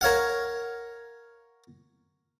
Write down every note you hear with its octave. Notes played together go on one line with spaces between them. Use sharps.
A#4 C#5 F5 F#5